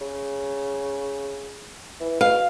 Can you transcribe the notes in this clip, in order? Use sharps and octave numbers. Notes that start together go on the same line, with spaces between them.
C#3
E3
B2 F5